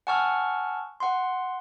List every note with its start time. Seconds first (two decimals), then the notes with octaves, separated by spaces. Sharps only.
0.07 F#5 G#5 A5 C#6 E6 F6
1.00 F#5 C6